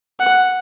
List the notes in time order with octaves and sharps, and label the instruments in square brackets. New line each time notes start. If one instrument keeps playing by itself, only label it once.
[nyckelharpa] F#5